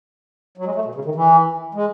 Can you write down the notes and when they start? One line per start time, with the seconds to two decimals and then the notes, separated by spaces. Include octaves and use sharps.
0.58 F#3
0.65 G#3
0.75 A3
0.85 B2
0.95 C#3
1.05 D#3
1.15 E3
1.74 G#3